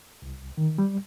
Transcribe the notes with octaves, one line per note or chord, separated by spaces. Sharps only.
C2
D#3
G3